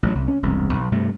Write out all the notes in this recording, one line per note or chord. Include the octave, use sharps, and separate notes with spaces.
A1 F3 F#3
C2
C#4
E1 C2 G2
B1
G2 C3 A3